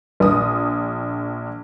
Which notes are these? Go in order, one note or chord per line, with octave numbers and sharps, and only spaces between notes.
A#1 D#6